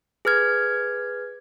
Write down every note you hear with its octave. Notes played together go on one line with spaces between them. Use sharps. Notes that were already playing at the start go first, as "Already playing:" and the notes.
G#4 B4 F6 G#6